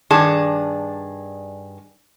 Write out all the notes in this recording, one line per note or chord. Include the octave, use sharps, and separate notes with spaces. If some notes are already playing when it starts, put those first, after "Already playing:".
G2 D#3 D4 G#4 A5